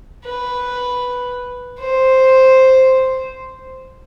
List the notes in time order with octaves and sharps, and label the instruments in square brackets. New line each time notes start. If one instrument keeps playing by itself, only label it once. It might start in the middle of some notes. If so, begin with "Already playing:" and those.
[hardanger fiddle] B4
C5